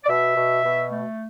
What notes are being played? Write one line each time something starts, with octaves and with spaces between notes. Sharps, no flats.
D5
B2 E5
B2
B2
A3